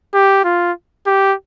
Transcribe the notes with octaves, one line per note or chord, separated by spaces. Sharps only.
G4
F4
G4